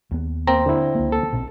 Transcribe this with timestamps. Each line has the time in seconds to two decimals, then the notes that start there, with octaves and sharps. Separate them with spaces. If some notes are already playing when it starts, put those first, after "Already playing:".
0.11 D#2 B3
0.47 A#3 C4 A#5
0.66 D3 E4
0.95 C#2 A#3
1.12 A4
1.32 A#1 B2 C4